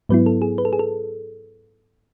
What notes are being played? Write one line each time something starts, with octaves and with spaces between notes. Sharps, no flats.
G#2 F#3 B3 E4 B4
A4
G#4
B4
A4
G#4
A4